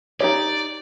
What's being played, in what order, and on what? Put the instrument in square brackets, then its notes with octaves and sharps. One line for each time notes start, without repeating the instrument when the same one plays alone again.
[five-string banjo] D#4 G4 C#5 [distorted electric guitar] D5